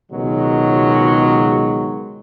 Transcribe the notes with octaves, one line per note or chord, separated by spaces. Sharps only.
C#2 B2 D#3 F#3 G#3